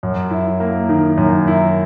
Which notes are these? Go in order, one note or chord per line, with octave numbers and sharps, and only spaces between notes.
F#2
E4
A#3
D#3
F#2
E4